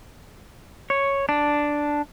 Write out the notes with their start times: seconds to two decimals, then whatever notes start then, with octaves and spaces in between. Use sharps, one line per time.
0.90 C#5
1.29 D4